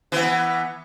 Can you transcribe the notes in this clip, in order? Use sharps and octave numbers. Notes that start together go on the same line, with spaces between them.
E3 B3